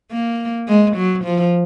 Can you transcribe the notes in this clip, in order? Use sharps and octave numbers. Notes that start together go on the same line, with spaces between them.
A#3
G#3
F#3
F3